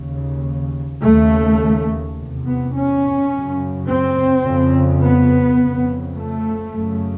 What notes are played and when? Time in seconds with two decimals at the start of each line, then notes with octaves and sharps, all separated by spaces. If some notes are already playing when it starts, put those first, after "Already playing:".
Already playing: D#2 C#3
1.04 D#2 C#3 A3
2.18 E2 C3
2.46 B3
2.74 C#4
3.31 F#2 C#3
3.87 C4
4.45 F2 C#3
5.02 B3
5.58 F2 C#3
6.16 A3
6.72 F#2 C#3